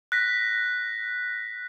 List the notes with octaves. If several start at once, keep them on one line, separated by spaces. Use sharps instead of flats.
F#6 A#6 B6